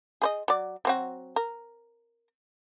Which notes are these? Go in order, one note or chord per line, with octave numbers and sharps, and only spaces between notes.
G#4 C5 D#5
F#3 D5
F#3 C4 F#4
A#4